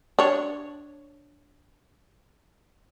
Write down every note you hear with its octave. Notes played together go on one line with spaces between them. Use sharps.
D4 C#5